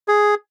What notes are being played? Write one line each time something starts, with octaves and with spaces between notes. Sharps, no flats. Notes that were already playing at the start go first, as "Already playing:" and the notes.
G#4